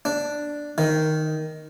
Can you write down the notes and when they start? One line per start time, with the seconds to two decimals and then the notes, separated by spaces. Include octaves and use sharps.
0.05 D4
0.78 D#3